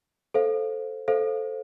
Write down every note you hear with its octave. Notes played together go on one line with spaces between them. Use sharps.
A4 C5 F5
A4 C5 F5